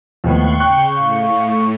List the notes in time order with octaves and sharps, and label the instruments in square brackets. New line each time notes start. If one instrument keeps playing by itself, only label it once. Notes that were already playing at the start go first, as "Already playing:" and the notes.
[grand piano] D#2 A2 B3 [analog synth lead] F3 [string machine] C6 C#6 F#6
[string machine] C#3 G6 [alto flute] G5 [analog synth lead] C#6 [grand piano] F#6
[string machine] A2 [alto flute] F5